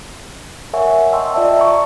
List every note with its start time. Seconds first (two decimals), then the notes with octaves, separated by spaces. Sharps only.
0.73 A#4 C#5 E5 F#5 G#5 C#6
1.13 D#5 G5 A5 C6 C#6 E6
1.34 F4 D5 E5 A5
1.57 A#5 C#6